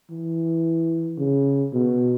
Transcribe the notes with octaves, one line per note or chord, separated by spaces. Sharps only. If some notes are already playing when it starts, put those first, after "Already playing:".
E3
C#3
B2